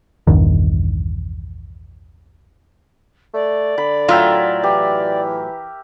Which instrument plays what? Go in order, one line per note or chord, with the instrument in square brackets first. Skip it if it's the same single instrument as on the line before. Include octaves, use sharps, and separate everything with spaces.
[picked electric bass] A#1 E2 G2 D#3
[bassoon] A3 [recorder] D5
[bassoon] D3 [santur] B5
[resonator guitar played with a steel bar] A2 F#3 F4 [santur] A#4 E5 G5
[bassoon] E3 [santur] G4